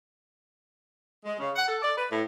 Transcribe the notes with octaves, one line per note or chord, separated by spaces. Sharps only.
G#3
C#3
F#5
A4
D5
B4
A2